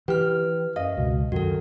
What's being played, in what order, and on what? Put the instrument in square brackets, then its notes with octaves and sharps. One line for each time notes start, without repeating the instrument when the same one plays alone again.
[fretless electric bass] E3 [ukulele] G4 [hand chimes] B4 F6
[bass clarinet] F#2 [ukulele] D#5 [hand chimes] F5
[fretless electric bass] C#2 [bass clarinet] B2
[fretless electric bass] F#2 [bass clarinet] D#3 [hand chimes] F#4 A4